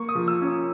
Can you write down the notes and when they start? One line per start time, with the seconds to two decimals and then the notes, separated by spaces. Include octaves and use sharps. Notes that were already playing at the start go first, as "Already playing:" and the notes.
Already playing: A#3 C#6
0.09 D#6
0.15 F3
0.28 E6
0.42 C#4
0.48 D#6